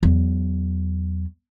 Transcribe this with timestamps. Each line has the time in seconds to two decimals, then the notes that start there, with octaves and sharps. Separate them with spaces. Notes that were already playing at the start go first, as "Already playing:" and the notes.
0.03 E2 F#3